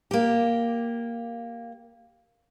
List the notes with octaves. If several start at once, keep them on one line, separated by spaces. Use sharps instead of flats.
A#3 G4